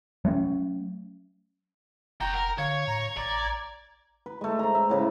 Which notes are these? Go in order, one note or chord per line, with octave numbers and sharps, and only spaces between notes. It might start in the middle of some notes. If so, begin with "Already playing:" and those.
F#3 A3 B3 C#4
F1 F#4 G5 A#5
A#4
D3 C#5 F5 G#6
A2 A#5
A1 D5
B4
G#3 A3
C5 A#5
E5
A2 C#3 B4